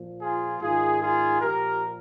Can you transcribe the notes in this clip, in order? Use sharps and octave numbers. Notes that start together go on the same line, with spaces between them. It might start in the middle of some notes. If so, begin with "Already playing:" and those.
Already playing: A#2 F3
F4 G#4
G#2 D#3 F4 G#4
F4 G#4
A#2 F3 G4 A#4